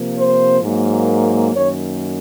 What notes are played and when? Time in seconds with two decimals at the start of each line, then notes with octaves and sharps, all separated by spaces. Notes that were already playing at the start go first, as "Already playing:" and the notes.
Already playing: C3 F3 A#3
0.17 C5
0.62 G#2 F#3 A#3
1.55 F#2 D#3 A#3 C#5